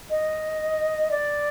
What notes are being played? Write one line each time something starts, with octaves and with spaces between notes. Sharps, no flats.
D#5
D5